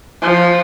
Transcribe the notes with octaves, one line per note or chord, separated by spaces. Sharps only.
F3